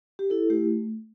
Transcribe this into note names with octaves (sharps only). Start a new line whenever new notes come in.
G4
E4 A4
A3 G4